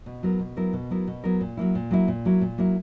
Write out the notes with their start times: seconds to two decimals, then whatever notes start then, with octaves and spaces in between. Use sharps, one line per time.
0.06 B2
0.23 F#3 B3 E4 A#4
0.39 B2
0.56 F#3 B3 E4 A#4
0.73 B2
0.90 F#3 B3 E4 A#4
1.07 B2
1.24 F#3 B3 E4 A#4
1.41 A#2
1.57 F#3 A#3 E4
1.75 A#2
1.91 F#3 A#3 E4
2.08 A#2
2.25 F#3 A#3 E4
2.41 A#2
2.58 F#3 A#3 E4